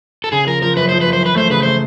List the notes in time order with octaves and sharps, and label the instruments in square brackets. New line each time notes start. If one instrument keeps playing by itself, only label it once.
[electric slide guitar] A4
[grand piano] C#3 [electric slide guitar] G#4
[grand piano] F3 [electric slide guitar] A#4
[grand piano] F3 [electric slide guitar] A#4
[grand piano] F#2 [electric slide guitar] B4
[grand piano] F3 [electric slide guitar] C5
[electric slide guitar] B4
[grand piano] F#2
[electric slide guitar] C5
[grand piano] E3 [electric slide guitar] B4
[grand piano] A3 [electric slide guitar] C5
[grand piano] C#3 [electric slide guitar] B4
[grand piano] A3 [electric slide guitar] C5